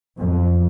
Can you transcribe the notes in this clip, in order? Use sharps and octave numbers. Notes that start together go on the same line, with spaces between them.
F2